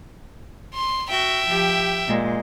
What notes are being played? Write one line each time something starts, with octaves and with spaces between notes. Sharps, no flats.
C6
F#4 E5 G5
F3 G4
A#2 G#3